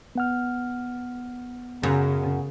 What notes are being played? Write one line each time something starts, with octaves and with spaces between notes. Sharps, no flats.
B3 F#5 F6
F#2 C#3